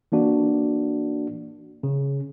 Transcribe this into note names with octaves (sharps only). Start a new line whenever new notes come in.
E3 A#3 D4 F#4
C#3